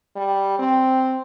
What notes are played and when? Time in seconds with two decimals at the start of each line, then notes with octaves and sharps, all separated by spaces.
0.16 G3
0.59 C4